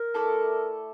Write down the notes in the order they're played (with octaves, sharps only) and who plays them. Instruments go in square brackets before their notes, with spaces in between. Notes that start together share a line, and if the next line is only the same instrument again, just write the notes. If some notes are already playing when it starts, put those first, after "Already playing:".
Already playing: [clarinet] A#4
[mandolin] A3 E4 A4 D5